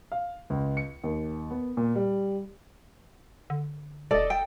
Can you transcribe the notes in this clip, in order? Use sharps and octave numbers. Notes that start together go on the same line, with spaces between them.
F5
C#2
C#7
D#2
B3
A#2
G3
D3
E1 A4 D5 D#5
G5